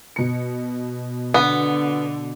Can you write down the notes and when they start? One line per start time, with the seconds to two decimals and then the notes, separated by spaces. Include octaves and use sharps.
0.16 B2 C#7
1.34 D3 B3